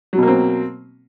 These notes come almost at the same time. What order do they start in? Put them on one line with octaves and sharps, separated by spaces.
F#3 B2 A#3 C4